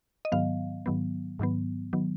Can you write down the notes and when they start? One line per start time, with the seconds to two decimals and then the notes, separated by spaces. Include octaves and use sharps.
0.25 D#5
0.32 G#2 D#3 F#3 B3 F5
0.86 G#2 D#3 F#3 B3
1.39 G#2 D#3 F#3 B3
1.93 D#3 F#3 B3